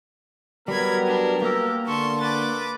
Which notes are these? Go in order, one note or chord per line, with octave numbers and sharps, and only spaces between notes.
F#3 G3 B3 A#4 B5 G#6
D4
A#3 G4 E6
D3 A4 C6 C#6
B4 D6 A6